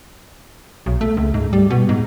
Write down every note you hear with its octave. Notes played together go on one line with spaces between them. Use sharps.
B1
A3
C#2
G#2
G3
B2
G#2